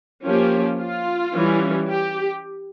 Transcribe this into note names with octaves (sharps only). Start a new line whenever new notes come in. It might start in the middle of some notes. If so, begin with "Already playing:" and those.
F3 A#3 C#4 G4
F4
E3 G3 C#4
G4